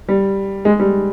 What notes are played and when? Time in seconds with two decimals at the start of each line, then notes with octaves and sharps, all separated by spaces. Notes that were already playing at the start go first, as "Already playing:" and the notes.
0.09 G3
0.65 G#3
0.80 G3